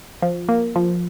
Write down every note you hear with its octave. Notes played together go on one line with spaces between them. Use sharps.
F3
A#3
F3